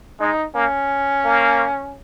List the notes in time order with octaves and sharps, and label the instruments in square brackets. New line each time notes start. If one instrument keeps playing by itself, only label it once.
[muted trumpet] G#3 [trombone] D#4
[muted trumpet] A#3 [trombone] C#4
[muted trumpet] A#3